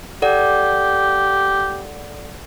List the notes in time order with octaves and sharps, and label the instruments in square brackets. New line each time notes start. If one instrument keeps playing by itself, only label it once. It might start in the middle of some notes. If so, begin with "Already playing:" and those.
[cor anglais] G4 [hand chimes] A4 D5 F#5